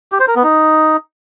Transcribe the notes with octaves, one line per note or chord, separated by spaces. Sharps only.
G4
C5
A#4
B3
D#4